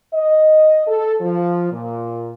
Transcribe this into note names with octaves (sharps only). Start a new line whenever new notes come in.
D#5
A4
F3
A#2